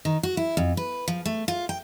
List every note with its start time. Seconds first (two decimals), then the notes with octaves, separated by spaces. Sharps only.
0.05 D#3
0.23 F#4
0.37 E4
0.57 F2
0.77 B4
1.08 F3
1.26 A3
1.48 F4
1.69 G5